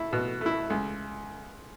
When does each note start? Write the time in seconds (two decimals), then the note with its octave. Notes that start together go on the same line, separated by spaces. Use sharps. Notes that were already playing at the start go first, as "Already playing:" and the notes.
Already playing: A3 E4
0.13 B2
0.41 A3 E4
0.70 C#2